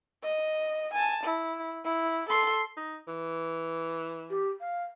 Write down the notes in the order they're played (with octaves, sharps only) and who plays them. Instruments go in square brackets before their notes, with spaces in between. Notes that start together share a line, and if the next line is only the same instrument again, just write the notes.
[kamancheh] D#5
G#5 A5
E4
E4
A4 C6
[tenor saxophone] D#4
E3
[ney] G4
F5